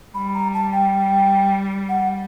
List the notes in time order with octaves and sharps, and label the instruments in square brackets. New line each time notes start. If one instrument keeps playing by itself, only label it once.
[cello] G3 [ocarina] B5
[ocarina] A#5
A5
G5
F#5